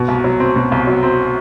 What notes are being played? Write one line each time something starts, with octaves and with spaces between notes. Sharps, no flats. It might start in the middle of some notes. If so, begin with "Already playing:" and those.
Already playing: B2
C2
F#3
C4
B2
C2
F#3
C4